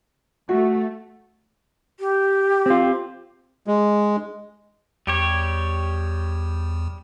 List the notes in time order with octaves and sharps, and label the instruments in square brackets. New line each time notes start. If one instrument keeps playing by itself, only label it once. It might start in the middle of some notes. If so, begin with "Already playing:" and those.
[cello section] A3 [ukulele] F#4
[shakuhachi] G4
[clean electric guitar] C4 F4
[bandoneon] G#3
[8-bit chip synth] E2 [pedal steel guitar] G3 G4 C#5